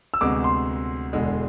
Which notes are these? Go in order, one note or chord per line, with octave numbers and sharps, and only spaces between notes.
E6
D2 C3 G#3 B3 D6
C6
E1 E2 D3 G#3